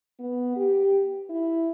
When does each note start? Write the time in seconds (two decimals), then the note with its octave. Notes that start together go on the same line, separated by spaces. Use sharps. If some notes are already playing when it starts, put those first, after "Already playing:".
0.19 B3
0.56 G4
1.29 E4